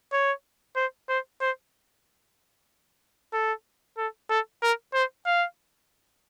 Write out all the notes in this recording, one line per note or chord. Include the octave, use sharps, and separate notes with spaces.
C#5
C5
C5
C5
A4
A4
A4
A#4
C5
F5